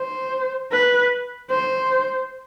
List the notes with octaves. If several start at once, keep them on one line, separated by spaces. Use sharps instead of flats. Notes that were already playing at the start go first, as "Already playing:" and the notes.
Already playing: C5
B4
C5